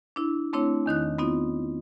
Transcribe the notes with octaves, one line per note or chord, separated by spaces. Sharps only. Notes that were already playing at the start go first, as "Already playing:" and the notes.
D4 E4
A3 C4 D4 E4 C#5
E2 D#3 D#4 F#6
B3 C4 D#4 F4